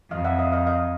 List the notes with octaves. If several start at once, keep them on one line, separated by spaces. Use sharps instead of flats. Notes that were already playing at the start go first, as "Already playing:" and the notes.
F2 D#5 F5
E5 F#5
D#5 F5
D#5 F5
D#5 F5